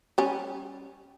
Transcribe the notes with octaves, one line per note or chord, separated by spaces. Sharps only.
G3 C#4